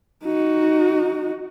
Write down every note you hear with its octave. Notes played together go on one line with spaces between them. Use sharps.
D#4 F#4